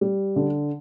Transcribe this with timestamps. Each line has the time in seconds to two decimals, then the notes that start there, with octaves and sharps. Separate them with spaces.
0.01 G3
0.36 D3